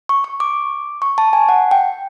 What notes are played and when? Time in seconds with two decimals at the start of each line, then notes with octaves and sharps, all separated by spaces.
0.09 C#6
0.24 C#6
0.40 D6
1.02 C#6
1.18 A5
1.33 G#5
1.49 F#5
1.71 G5